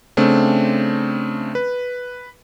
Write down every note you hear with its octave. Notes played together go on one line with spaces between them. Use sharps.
C#3 A3 C4 D4
B4